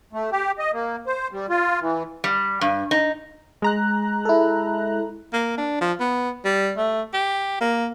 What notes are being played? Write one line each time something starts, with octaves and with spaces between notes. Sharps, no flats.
A3
G4
D#5
A#3
C5
G3
F4
E3
G3
G2
D#4
G#3 A#5 F#6
E4 A4
A#3
D4
F3
B3
G3
A3
G4
A#3